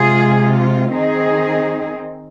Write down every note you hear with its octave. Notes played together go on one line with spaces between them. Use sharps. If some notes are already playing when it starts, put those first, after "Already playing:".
Already playing: C3 G#3 F4 G#4
F4
D#3 C4 D#4 G#4